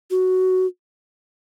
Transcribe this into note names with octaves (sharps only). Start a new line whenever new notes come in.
F#4